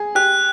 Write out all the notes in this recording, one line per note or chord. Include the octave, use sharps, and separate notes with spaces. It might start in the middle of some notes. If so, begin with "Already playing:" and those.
Already playing: G#4
G4 F#6